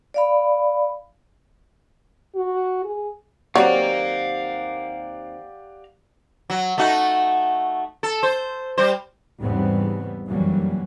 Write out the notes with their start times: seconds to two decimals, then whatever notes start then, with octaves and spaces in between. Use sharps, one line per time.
0.14 D5 F5 B5
2.35 F#4
2.84 G#4
3.55 D#2 F#3 C4 G4 D5 F5 F#5 A#5
6.50 F#3
6.78 A3 D#4 F#4
8.03 A4
8.23 C5
8.78 G3 C5
9.40 E2 G#2 C#3 G3 B3 C4
10.27 F1 F#2 E3 F#3 G3 A#3